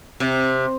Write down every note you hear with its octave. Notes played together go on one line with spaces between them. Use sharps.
C3